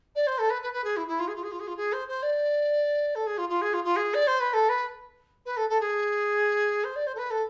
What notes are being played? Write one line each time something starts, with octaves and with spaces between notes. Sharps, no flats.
D5
C5
A4
B4
B4
B4
G#4
E4
E4
F4
G#4
F4
G#4
F4
G#4
F4
G#4
C5
C5
D5
A4
G#4
F4
F4
G#4
F4
F4
G#4
D5
C5
B4
A4
B4
B4
A4
A4
G#4
C5
D5
C5
A4
B4
A4